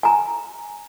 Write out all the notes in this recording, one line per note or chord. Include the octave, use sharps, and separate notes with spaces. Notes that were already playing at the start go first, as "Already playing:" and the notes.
G#5 A#5